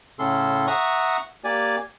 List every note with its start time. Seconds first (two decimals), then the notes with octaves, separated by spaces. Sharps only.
0.19 A2 C#3 C#4 A4 C6
0.67 E5 F#5 A#5 C#6 D#6
1.44 A#3 G4 D5 G#5